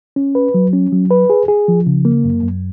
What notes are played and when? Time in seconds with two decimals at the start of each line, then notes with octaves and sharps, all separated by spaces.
0.16 C#4
0.35 B4
0.54 F#3
0.73 C#4
0.92 F#3
1.11 B4
1.30 G#4
1.48 G#4
1.68 F3
1.87 C#3
2.05 A#3
2.24 F#2
2.43 F#2